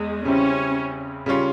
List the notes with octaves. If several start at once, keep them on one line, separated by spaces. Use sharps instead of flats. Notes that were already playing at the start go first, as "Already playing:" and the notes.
Already playing: E2 G#3
C#3 G3 C4 C#4 E4
C#3 G3 C#4 F4